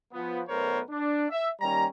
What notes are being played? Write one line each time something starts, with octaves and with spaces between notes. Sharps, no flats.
F3 B3
B1 A3 B3 A#4 C5 C#5
D4
E5
D#2 G3 C#4 A#5